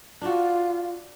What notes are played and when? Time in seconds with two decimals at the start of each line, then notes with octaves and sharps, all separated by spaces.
0.22 D4 F4 F#4